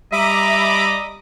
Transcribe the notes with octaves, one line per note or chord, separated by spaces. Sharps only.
G3 D#5 E5 A#5 B5 D6